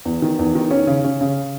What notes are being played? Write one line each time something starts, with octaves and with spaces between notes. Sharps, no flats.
E2
D#3
E2
D#3
C#4
C#3
C#4
C#3